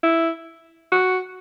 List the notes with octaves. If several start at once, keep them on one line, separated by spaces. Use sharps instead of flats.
E4
F#4